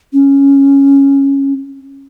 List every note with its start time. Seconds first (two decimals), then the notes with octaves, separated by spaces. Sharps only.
0.13 C#4